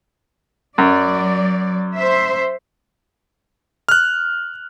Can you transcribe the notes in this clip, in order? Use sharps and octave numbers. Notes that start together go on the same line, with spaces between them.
F#2 F#3 D5
C5 E5
F6 F#6